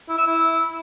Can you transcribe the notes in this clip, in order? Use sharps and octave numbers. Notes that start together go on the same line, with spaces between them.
E4
E5
E4